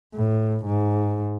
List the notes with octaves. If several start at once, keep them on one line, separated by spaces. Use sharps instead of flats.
A2
G#2